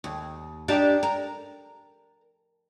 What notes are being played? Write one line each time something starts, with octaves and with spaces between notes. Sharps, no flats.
D#2
D4 D#4 G4
A#4